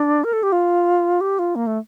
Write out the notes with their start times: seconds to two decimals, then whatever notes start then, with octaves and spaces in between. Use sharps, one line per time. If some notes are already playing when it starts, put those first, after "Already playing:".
Already playing: D4
0.24 A#4
0.33 A4
0.43 G4
0.52 F4
1.21 G4
1.39 F4
1.56 A#3
1.67 A3